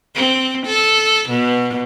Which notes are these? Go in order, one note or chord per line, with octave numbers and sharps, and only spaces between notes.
C4
A4
B2